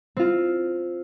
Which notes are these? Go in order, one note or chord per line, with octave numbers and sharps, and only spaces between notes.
C4 F4